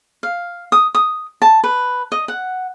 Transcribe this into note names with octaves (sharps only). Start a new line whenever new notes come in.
F5
D#6
D#6
A5
B4
D#5
F#5